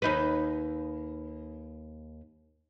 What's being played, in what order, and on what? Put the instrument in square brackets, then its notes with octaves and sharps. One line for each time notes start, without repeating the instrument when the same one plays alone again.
[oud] D#2 D#4 B4